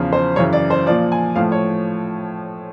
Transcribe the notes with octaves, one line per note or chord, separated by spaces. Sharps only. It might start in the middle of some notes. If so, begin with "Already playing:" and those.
Already playing: E2 C#3 F3
C5
F#2 C#3 E3 C#5
D5
C5
A#2 F3 D5
G#5
A2 F3 F5
C#5